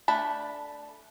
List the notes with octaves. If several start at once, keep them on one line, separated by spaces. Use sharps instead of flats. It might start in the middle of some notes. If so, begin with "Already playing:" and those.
A3 D4 A5 B5